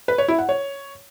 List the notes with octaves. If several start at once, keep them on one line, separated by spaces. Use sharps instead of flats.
B4
C#5
E4
F#5
C#5